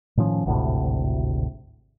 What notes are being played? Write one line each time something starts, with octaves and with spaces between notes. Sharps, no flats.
A2 D#3 F3 C#4
G#1 D2 A2 C3